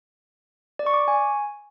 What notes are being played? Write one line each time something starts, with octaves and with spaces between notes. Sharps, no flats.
D5
C#6
D6
C#6
G#5